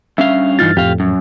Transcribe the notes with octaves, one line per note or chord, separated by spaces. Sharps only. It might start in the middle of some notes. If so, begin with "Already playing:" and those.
G2 C#4 E5 F5
G2 E3 D#4 F4 F6 A6
F2 A2 G4 F5
F#2